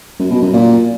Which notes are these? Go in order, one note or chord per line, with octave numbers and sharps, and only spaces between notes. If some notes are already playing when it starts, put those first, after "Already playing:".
F#2
B2
F#2
A#2